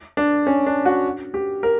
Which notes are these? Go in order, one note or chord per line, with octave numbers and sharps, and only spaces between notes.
D4
C#4
D4
F#4
G4
A#4